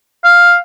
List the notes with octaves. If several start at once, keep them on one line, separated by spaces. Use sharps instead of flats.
F5